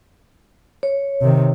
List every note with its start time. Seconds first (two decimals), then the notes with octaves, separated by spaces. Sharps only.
0.83 C#5
1.22 C3 D#3